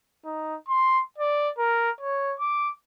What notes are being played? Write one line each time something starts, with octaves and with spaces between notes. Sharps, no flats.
D#4
C6
D5
A#4
C#5
D6